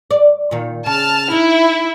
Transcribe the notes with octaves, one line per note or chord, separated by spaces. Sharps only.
D5
A#2 D#3
C#3 A5 F6
D#4 E4